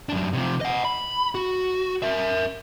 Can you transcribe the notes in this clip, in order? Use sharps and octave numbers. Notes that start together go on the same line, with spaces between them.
F#2 D4
C3 F3
D#5 F#5
B5
F#4
A#4 E5